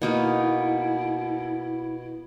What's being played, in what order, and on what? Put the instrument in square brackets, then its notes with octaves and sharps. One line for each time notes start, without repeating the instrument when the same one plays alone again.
[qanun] B2 A#3 D#4 [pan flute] E4